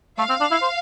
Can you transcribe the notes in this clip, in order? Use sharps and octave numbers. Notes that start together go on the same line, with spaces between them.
A3 F5
C4
D4
E4
C5